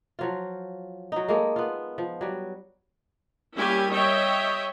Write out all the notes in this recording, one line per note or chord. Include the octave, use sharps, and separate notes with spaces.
F3 F#3 F4
F#3 D#4
G#3 A#3 A4
B3 F4
F3
F#3 G3
G3 A#3 C#4 E4 G4 G#5
C#5 D#5 E5 G5